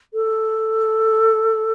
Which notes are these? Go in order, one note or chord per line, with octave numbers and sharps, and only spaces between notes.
A4